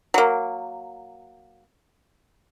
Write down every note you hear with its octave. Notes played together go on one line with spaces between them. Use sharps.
F#3 A#3